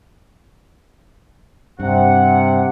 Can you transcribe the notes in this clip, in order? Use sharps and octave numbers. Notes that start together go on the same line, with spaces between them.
G2 C3 F#5